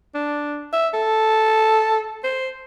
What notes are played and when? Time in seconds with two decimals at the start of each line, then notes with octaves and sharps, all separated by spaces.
0.14 D4
0.73 E5
0.93 A4
2.24 C5